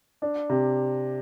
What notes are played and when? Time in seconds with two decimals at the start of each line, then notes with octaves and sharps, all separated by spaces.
0.22 D4
0.50 C3